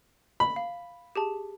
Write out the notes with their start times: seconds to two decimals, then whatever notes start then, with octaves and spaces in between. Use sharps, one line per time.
0.40 B5
0.56 F5
1.16 G4 G#4 A5